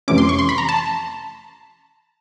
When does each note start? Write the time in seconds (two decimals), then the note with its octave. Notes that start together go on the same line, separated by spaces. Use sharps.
0.08 F2 C3 E3 A3 C#4 D6
0.18 C6
0.29 C#6
0.39 C6
0.49 B5
0.58 A#5
0.69 A5